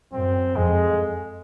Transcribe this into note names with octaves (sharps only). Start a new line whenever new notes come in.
F#2 C4
F2 G#3